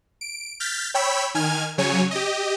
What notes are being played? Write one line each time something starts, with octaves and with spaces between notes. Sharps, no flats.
D7
F6 G6 A6 B6
C#5 G5 B5 E6 B6
D#3 G#5 F6 G#6
C#3 F#3 C#5 G#5
G4 D#5